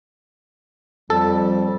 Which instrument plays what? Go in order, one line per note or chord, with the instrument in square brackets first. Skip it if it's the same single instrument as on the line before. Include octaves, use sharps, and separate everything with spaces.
[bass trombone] F2 [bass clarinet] G3 [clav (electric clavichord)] A4